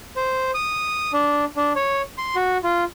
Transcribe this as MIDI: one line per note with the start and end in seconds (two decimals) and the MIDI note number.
0.16 0.51 72
0.55 1.12 87
1.13 1.45 62
1.56 1.73 62
1.76 2.02 73
2.18 2.36 84
2.36 2.58 66
2.64 2.84 65